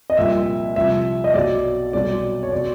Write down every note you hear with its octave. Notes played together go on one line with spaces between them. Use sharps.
D#5
C2 A#2 F3 E5
C2 C3 F3 E5
D#5
B1 B2 F#3 D5
C2 B2 F#3 D5
C#5
B2 F#3 D5